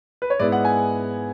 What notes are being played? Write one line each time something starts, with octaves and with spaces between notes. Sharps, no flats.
B4
C#5
G#2 G#3 B3 E4 D5
F#5
G#5